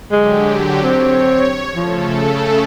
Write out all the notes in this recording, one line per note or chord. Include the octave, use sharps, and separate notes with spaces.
D3 F#3 G#3 G4
C4 C#5
C#3 F3 A3 A4